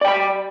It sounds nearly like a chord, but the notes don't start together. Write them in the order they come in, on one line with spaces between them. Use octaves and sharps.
D5 G5 B5